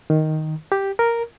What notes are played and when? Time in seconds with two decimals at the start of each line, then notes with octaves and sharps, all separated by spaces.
0.10 D#3
0.72 G4
0.99 A#4